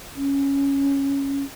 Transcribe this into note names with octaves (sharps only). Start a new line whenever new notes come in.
C#4